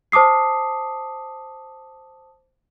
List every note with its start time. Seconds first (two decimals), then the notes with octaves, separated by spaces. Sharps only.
0.12 C5 A5 D6 D#6 C7